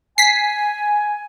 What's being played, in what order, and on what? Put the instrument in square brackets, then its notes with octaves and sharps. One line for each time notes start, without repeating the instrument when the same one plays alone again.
[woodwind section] G#5 [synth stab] B6 C7